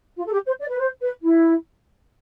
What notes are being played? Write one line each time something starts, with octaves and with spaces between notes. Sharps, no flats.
F4
A4
G4
C5
D5
B4
C5
B4
E4